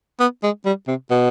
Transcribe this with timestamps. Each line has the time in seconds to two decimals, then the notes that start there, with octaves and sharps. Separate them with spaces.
0.20 B3
0.43 G#3
0.65 G3
0.88 C3
1.10 B2